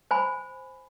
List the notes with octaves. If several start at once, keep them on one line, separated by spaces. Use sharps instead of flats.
C5 G#5 B5